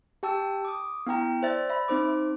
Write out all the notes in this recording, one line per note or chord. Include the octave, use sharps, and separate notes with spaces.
G4 G5 A5 E6
D6 D#6
B3 E4 G5 A#5
C5 D5 E5 A6
E5 B5
C4 D#4 C5 D6